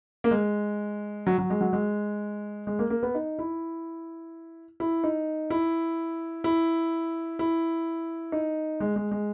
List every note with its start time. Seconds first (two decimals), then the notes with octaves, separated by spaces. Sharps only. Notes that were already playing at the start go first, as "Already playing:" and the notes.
0.24 A#3
0.31 G#3
1.27 F#3
1.38 F#3
1.50 G#3
1.61 F#3
1.73 G#3
2.67 G#3
2.79 A#3
2.90 A#3
3.03 B3
3.15 D#4
3.39 E4
4.80 E4
5.04 D#4
5.50 E4
6.44 E4
7.39 E4
8.32 D#4
8.80 G#3
8.96 G#3
9.11 G#3